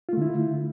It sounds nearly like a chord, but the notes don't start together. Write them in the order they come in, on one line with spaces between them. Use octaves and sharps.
F4 A3 D3 E4